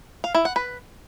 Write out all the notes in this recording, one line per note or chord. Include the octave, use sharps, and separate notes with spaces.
F5
E4
F#5
B4